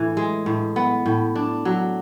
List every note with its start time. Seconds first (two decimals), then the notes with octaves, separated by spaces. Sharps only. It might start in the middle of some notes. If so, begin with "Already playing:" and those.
Already playing: A2 E3
0.17 G#3
0.46 A2
0.76 B3
1.06 A2
1.35 D4
1.65 F#3